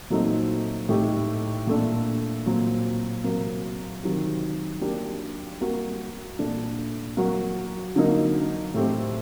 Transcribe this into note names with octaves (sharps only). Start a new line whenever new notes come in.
A#2 F#3 A3 C4 D#4
A2 A3 D#4 G4
A#2 A3 D4
A#2 F#3 C4
C3 F#3 A#3
C3 D#3 F#3 C4 G4
F#3 A#3 D4 G4
G3 A#3 F#4
A#2 A3 D4
F#3 A#3 F#4
D3 F#3 A#3 D#4
A2 A3 C4 G4